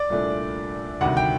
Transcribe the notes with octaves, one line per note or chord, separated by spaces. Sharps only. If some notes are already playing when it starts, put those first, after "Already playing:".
Already playing: D5
C2 A#2 A3 D4
D2 C3 D#3 G3 F#5
G5